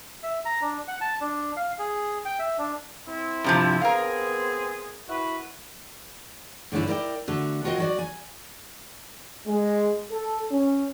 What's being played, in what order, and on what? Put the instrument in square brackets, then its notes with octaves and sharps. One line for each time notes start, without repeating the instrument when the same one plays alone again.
[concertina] E5
A#5
D4
F#5
A5
D4
F5
G#4
G5
E5
D4
[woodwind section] C4 E4
[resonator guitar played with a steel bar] G2 C3 F3
[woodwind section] B3 C4 G#4 [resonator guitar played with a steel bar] A#4 F5
[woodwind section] E4 F#4 B4
[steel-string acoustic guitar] G2 D3 A3 C#4 E4
E4 A#4 D5 E5 G5
D3 A3 F#4
F4 F#4 A#4 B4 D#5 G5
F#3 F#4 D5
G#5
[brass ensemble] G#3
A4
C#4